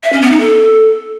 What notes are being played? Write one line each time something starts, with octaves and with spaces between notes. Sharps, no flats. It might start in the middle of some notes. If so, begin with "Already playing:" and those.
E5
C#4
B3
D#4
A4